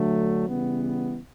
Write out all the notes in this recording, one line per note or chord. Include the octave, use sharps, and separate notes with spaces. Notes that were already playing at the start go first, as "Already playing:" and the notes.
Already playing: D3 F#3 A3
C#3 E3 G3 B3